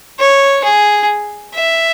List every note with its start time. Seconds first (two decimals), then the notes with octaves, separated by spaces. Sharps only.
0.19 C#5
0.64 G#4
1.55 E5